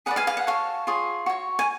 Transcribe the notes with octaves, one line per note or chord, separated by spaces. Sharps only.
G#4 B4 D5 F#5
F5 G#5
F5 G#5
F#5
F#4 A4 C#5 F5
F4 G#4 C#5
F#4 C#5
G#5